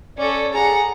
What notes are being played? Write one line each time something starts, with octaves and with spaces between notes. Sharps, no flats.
C#4 A4 D5
G#4 F#5 A#5